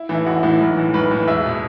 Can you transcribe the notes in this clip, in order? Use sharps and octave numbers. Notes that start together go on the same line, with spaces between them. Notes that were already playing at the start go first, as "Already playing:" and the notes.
Already playing: E4
A2 E3
E4
A1 F#4
A2 E3
B1
A2 E3
B1 B4
A2 E3
E1 E5
B2